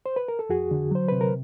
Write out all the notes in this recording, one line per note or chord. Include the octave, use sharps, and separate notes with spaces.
C5
B4
A#4
A4
F2 F#4 G#4
D3
F#3 C5
C3 B4
A#4